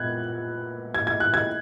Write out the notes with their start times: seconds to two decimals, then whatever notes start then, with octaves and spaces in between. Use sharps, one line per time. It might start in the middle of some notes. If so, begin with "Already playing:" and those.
Already playing: A#2 B3 F#6 G#6
0.94 G#6
1.07 G#6
1.20 F#6
1.34 G#6